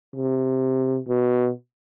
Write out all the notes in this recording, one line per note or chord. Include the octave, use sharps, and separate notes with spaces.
C3
B2